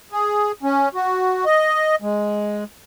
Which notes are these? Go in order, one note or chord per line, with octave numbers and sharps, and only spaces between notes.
G#4
C#4
F#4
D#5
G#3